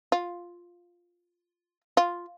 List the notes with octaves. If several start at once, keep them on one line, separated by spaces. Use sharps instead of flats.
F4
F4